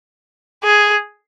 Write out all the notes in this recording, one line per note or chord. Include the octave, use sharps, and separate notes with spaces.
G#4